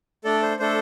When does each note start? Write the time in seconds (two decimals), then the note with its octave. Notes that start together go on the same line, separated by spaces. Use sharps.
0.24 A3 D4 A4 D5
0.42 C5
0.59 A3 D4 A4 C5